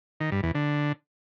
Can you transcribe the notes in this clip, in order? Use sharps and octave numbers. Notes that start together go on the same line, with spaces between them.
D#3
G2
E2
D3